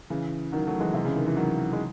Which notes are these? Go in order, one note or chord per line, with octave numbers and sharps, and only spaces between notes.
C#3 E3
D#3 F#3
F#3 A3
E3 G#3
C3
C#3
D#3
E3
D#3 F#3
G#3